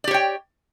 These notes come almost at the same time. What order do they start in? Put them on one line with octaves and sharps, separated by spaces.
D5 G4 C#5 G5